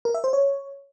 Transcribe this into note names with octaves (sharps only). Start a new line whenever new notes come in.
A#4
E5
C5
C#5